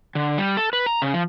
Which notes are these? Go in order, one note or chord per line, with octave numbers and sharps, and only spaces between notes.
D3
G3
A4
B4
A#5
C#3
F3